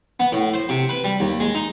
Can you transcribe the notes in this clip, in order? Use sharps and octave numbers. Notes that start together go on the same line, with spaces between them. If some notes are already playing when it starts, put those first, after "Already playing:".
B3
A2
C5
C3
B4
G3
D#2
G#3
D#4